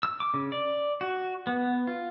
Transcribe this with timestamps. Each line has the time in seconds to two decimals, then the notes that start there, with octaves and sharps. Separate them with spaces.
0.03 E6
0.20 D6
0.34 C#3
0.52 D5
1.01 F#4
1.47 B3
1.87 F4